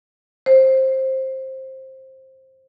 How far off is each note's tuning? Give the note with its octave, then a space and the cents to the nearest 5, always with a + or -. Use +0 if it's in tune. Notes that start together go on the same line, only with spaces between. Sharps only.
C5 +15